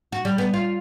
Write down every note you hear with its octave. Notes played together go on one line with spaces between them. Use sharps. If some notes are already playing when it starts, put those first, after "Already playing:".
F#4
G3
B3
F4